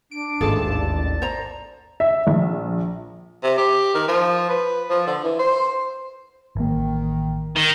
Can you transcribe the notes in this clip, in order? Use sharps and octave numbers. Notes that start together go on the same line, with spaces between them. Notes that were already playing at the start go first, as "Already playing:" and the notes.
D4 D7
A1 D#2 G#2 C#4 F4 G#4 A4 A5
D5
C5 A#5
E5
A#1
C3
G4
D#3
F3
B4
F3
D3
E3
C5
A1 D#3 A#3
D#3